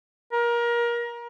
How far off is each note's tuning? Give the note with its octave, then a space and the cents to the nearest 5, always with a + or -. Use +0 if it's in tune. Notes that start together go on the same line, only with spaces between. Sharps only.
A#4 +25